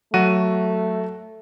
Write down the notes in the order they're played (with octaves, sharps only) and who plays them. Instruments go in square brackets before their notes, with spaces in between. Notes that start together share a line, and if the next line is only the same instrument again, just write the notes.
[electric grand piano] F#3 F#4 D#7 [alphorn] A3